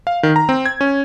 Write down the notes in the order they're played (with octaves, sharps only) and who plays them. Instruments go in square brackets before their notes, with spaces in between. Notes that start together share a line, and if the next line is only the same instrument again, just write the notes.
[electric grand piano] F5
D#3
A#5
C4
G#6
C#4